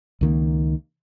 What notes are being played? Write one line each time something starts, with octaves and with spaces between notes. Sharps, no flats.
C#2 D#3 A#3